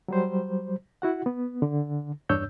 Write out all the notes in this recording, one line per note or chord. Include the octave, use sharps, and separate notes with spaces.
F#3 G3 C5
E4 F#4 F#5
B3
D3
E2 G2 D4 C#5 E6 G6